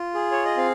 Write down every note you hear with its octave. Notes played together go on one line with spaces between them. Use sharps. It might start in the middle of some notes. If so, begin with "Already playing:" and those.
Already playing: F4
G#4
C#5
D#5
C4 F5